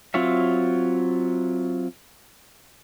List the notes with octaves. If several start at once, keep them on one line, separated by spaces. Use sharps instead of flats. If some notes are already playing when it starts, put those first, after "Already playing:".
F#3 C4 F4 C#5 E5